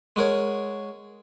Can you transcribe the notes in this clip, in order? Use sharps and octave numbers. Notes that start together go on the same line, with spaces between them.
G#3 F#4 A#4 C#5